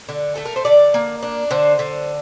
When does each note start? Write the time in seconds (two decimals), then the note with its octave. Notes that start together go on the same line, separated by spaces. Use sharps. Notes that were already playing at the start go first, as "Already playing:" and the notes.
0.09 D3
0.36 A3 A4
0.45 A#4
0.56 C5
0.65 D3 D5
0.94 A#3
1.23 D4
1.51 D3 C5
1.79 D3